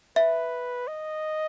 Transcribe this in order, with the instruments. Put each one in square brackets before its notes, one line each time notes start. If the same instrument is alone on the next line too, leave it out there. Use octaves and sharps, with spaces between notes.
[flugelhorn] B4 [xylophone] E5
[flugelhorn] D#5